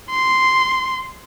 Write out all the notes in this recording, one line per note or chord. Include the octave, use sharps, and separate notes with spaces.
C6